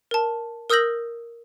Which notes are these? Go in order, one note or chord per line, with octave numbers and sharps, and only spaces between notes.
A#4 A5
A#4 D#6 E6 G6 A#6 F#7